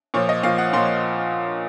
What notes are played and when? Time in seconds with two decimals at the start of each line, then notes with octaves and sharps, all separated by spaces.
0.14 A#2 F3 C#5
0.29 D#5
0.43 A#2 F3 F5
0.58 F#5
0.73 A#2 F3 C6